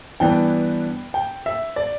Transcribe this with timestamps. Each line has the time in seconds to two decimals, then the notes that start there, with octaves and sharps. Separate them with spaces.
0.20 G2 E3 B3 D4 G5
1.14 G5
1.46 E5
1.76 D5